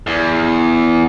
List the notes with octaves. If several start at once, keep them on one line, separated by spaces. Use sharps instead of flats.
E2